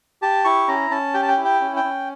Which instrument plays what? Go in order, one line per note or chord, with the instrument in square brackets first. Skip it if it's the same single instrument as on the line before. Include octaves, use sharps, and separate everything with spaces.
[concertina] G4 A5
E4 C#6
C#4 A#5
C#4 A5
G4 G5
A5
G5
E4
G5
C#4
G5
C#4